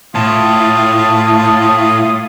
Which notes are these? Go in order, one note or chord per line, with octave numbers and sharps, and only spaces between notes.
A2 F4 A5 D#6